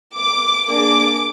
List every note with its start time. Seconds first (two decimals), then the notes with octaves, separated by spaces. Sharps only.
0.17 D6
0.68 A#3 D4 G#4 D6